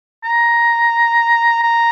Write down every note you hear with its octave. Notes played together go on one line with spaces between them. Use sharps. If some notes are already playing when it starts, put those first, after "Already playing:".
A#5
A#5